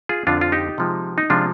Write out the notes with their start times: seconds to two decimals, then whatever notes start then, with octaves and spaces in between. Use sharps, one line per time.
0.09 F4 G#4
0.27 F2 D3 F3 C4 D4 F4
0.41 F4
0.52 D#4 G4
0.78 C3 F3 G#3
1.18 D#4
1.30 C3 F3 G#3 D4 F4